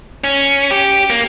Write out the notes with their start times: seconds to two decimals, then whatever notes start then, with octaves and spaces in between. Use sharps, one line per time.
0.24 C#4
0.71 G4
1.10 A#3